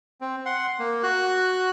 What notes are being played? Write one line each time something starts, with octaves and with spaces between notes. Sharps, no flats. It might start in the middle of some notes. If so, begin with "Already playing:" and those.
C4
F#5 C6
A#3
F#4 F#6